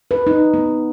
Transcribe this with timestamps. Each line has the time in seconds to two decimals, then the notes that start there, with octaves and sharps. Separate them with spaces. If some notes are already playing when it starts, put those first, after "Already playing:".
0.11 B4
0.27 D#4
0.54 B3